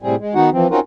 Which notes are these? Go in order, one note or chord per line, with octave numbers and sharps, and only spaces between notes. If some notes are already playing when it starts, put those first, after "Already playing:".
A2 C3 G3 C4 G#4
G#3
D#3 B3 D#4 F#4 F#5
E3 F3 C4
C4 C#4 D#4 F4 F#4 A#4